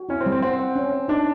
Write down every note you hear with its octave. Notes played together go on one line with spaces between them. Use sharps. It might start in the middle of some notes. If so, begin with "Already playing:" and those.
Already playing: F#4
C#4 E4
C4
G3
C4
C4 F#5
F#5
C#4
C#4
D4 D#4